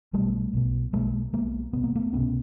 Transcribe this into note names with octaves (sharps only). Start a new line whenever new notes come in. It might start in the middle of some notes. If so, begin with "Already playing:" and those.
B1 B2 G3 A3
B1 B2
B1 B2 G#3 A#3
B1 B2 G#3 A#3
C2 B2 B3
A#3
A3 B3
C2 B2 B3 C#4